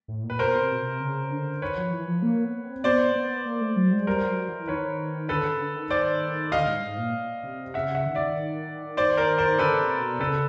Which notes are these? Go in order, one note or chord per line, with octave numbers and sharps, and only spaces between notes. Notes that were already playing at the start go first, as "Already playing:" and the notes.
A2
A#2
B4
B2 A#4 C5
C3
B2
C3
C#3
D3
D#3 B4 C#5
F3
E3
F3
A#3
B3
C4
B3 C5 D5
B3
A#3
A3
F#3
G#3
G3 A#4 C5
F#3
E3
D#3 B4 C#5
D3 A4 B4
C#3
D3
D#3
C5 D5
D3 D#5 F5
G#2
G2
G#2
A#2
C3
C#3 E5 F#5
E5 F#5
D#3
D5 E5
C5 D5
A#4 C5
A#4 C5
D3 A4 B4
C#3
C3
B2
C#3 A4 B4